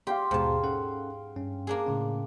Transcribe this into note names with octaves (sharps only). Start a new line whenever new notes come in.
G4 D5 F5 G5 C6
D#2 G#2 B2 A5
C#4 A4 F#5
G2 C#4
A#3 D4 G#4
A2 C#3 C#4